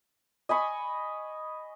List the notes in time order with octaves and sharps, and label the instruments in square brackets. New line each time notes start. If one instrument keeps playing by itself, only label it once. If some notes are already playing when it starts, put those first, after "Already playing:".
[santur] D#5 G#5 B5 C#6